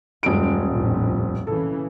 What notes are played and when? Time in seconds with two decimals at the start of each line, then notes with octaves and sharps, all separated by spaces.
0.23 D#1 F#2 G#3 D7
0.70 A#1 F2 A2
1.47 C#3 E3 A4